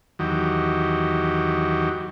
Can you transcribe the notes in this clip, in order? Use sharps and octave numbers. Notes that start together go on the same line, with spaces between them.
E2 D#3 F#3 G4